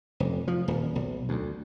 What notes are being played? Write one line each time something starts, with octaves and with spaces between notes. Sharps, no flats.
F1
F3
D#1
B1
D2